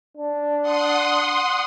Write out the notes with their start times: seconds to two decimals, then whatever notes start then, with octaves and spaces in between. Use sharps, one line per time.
0.17 D4
0.62 F#5 C6 D#6